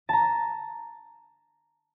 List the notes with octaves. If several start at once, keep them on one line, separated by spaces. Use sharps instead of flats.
A5 A#5